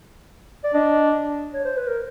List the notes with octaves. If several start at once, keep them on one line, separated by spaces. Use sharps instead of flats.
D5
D4 D#5
C#5
C5
B4
A#4